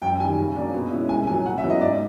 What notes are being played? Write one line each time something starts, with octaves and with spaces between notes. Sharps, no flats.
F#2 G5
D#3 G3 G#5
C#3
F#3 A#3 D4
B2
G#3 C#4 E4
C2 G#5
A#2 F#3 G#5
C#3 F#5
E5
F#3 B3 E4
D#5
G#2 D5